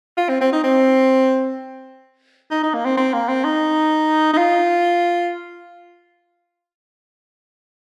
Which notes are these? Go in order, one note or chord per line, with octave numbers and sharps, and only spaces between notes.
F4
C4
C4
D#4
C4
D#4
D#4
A#3
C4
C4
A#3
C4
D#4
D#4
F4